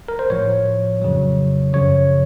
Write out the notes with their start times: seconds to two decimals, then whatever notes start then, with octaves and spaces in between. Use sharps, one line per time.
0.08 A#4
0.19 C5
0.30 A2 F3 C#5
1.02 F2 C#3 F#3
1.73 F#2 C#3 F3 C#5